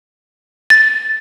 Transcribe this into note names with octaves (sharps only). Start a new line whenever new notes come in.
A6